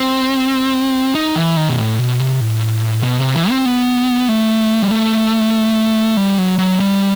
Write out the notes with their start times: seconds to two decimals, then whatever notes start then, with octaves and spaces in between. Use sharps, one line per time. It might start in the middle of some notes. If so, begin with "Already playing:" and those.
Already playing: C4
1.15 D#4
1.36 E3
1.57 D#3
1.69 B2
1.78 A2
1.99 B2
2.20 C3
2.40 A2
3.03 B2
3.19 C3
3.34 E3
3.50 C4
3.66 B3
4.29 A3
4.83 G3
4.91 A3
6.17 G3
6.38 F#3
6.58 F#3
6.80 G3